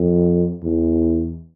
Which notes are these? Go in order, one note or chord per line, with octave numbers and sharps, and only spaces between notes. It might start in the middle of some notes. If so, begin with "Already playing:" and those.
Already playing: F2
E2